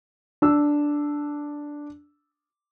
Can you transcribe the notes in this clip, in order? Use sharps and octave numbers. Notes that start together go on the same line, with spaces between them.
D4 E6